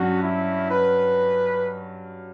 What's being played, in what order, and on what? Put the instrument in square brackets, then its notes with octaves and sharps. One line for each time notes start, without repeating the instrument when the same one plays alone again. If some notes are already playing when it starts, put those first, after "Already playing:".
Already playing: [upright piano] G2 F#3 C#4 [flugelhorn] F#4
[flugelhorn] E4
B4